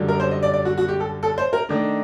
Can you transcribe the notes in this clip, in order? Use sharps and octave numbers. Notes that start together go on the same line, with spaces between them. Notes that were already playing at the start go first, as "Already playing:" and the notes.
Already playing: F#2 D3 G3
A#4
C5
D#5
D5
D5
F#4
F#4
G4
A4
A4
C5
A#4
D#3 A3 D4